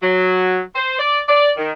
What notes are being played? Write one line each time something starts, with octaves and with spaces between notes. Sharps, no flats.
F#3
C5
D5
D5
D#3